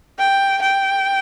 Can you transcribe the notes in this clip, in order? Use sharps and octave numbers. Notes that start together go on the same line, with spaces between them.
G5
G5